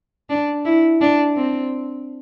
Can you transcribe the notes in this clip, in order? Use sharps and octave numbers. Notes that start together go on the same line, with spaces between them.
D4
E4
D4
C4